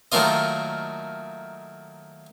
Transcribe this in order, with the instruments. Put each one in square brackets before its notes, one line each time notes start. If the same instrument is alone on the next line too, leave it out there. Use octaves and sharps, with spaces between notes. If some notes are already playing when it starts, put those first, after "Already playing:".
[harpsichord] D#3 F#3 A3 A#3 F4 D#5